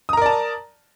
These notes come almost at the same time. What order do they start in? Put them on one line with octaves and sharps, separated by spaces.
D#6 A#5 A#4 D5 A5